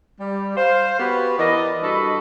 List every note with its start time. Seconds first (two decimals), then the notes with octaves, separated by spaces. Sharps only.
0.19 G3
0.57 C5 F5
0.99 B3 F#4 G4 B4
1.39 E3 A#4 D5 D#5
1.83 G2 F#4 A4 D#5 B5